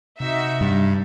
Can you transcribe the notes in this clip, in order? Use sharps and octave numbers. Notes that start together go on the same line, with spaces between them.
C3 D#4 F#4 E5
G2